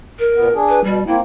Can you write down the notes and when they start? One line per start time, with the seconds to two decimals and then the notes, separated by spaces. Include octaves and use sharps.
0.19 A#4
0.35 A#2 B3
0.55 D4 G#4
0.69 B4
0.84 B2 G3
1.07 A#3 C4 E4